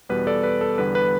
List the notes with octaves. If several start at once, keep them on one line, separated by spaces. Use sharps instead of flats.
E2 B2 G3 B3 B4
A4 D5
B4
A4
E2 D3 G3 B3 B4
B4